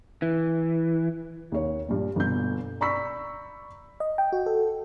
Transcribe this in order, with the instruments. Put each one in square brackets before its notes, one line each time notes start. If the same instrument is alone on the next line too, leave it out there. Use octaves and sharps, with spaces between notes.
[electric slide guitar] E3
[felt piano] D#2 C#5
G2 A#2
G1 B2 G6
D5 A#5 B5 C#6 E6 B6
[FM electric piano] D#5
G5
F#4
A4